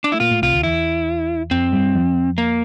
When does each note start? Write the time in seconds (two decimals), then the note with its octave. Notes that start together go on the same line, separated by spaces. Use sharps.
0.04 D4
0.12 A3 E4
0.20 A#2 A#3 F4
0.31 A2 A3
0.42 C2 C3 F4
0.53 D2 D3
0.63 E2 E3 E4
1.51 F2 F3 C4
1.72 G2 G3
1.94 F2 F3
2.38 A#3